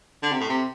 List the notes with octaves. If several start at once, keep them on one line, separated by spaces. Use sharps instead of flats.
D3
C3
A2
C3